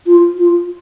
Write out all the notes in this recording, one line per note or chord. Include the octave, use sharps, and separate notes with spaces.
F4
F4